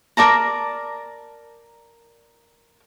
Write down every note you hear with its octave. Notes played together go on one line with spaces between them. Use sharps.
A#4 D5 A5 A#5